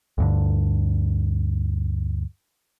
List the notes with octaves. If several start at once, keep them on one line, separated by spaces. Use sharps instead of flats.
D2 G2 D3